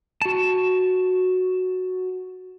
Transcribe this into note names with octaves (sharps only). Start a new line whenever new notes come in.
F#4 A5